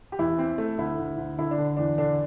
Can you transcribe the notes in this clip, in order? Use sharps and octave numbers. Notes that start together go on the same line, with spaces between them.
G4
E2 E4
C4
A3
D2 E4
D2
D2
D3 E4
D4
D3
E2 D4
D3 D4